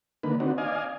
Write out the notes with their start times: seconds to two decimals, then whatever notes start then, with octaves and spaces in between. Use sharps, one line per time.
0.23 D3 D#3 A#3 B4
0.40 C4 D4 D#4 F#4
0.58 D5 D#5 F5 G#5